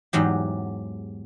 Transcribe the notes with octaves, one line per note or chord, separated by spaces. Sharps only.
E2 G#2 F#3 G4